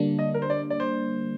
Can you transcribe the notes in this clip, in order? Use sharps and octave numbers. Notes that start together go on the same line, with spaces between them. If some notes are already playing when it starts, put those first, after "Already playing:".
Already playing: D3 G3 A#3 D4
D#5
A#4
C5
D5
D5
C5